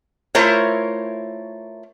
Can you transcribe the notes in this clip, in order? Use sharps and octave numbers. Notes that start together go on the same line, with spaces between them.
A3 E4 F4 A#4 C5 C#5